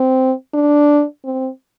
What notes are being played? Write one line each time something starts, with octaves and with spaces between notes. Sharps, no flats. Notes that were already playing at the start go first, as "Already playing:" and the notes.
Already playing: C4
D4
C4